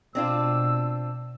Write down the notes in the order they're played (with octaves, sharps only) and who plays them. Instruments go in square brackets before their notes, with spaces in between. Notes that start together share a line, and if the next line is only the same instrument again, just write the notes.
[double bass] B2 [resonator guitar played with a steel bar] C4 D4 F4 [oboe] E6